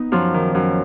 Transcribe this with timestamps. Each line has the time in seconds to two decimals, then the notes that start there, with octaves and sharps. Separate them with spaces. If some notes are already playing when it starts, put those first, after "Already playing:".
Already playing: B3 D#4
0.12 F#2 F3 F4
0.34 D#3
0.55 F#2